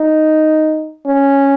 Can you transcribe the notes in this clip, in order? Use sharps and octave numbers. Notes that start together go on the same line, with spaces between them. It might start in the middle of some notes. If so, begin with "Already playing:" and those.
Already playing: D#4
C#4